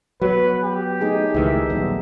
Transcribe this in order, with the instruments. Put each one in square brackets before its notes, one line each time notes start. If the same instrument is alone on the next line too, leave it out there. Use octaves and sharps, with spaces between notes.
[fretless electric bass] F#3 B3 [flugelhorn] B4
[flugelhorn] G4
[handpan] A3 D#4 G#4
[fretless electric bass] C#2 D#3 E3 [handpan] A3 E5
[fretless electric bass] A#1 D#2 [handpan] F#3 G3 B3